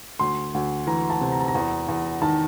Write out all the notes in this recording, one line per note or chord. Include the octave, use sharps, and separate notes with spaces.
D2 C6
D2
E3 A#5
A5
C3
A#5
A5
A#5
E2
E2
D#3 A5